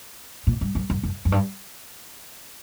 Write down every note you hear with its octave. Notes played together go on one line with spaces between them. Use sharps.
A#2
G2
F#2
F#2
F#2
F#2
G2